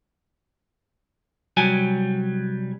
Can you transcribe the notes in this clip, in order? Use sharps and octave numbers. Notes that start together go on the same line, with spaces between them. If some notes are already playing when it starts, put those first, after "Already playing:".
C2 F#3 G3 G#5